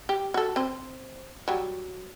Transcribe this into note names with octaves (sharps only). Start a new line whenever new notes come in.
G4
F#4 A4
C4 C5
F#3 G3